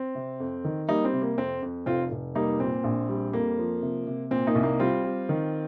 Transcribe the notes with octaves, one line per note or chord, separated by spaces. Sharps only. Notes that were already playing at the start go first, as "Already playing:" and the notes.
Already playing: C4
C3
F2
D#3
G3 A#3 D#4
C4
C3
A#3
F2 C4
F2
F1 C4 F4
F1
G3 A#3 D#4
A#2 C4
A#1
G3
F2 A#3
F3
C3
C3
A#2 C4
A#3 D#4
C2
A#3 D#4
G3 C4 F4
G3
D#3